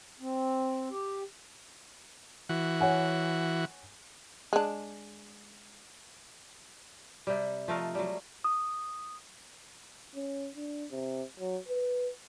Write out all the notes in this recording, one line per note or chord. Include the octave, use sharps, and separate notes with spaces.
C4
G4
E3 F#4
C#5 F#5 G#5
G#3 D4
C3 G3
F3 A3 A#4 D#5
F#3 G3
D#6
C#4
D4
C3
F#3
B4